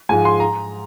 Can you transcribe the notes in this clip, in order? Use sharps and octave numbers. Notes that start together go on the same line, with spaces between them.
G#2 F3 G#3 G#5
C6
A#5